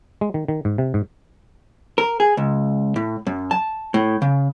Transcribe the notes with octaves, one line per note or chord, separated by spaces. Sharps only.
G#3
D#3
D#3
G#2
C3
G#2
A#4
G#4
C#2
A2
F#2
A5
A2
C#3